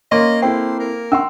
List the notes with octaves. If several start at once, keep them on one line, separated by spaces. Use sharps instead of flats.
A#3 C#4 D#5 C6
C4 E4 A4 C5 G5
A#4
C#4 F#5 C6 E6